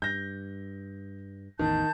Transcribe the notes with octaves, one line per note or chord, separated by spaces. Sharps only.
G2 G6 A#6
A1 E2 D#3 A5 G6